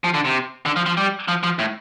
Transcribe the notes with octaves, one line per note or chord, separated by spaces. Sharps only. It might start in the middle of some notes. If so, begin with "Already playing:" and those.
F3
D3
C3
D3
F3
F3
G3
F3
F3
A2